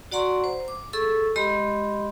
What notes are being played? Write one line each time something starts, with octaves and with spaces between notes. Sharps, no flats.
F#4 D5 F#5 A#5 C6 C#6
C5
D6
G#4 A4 C#6 E6
G#3 G4 D#5 B5 C6